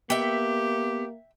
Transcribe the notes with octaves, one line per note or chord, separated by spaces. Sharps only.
A#3 B3 G4 E5 G5